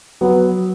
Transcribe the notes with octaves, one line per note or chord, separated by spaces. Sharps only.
F#3 B3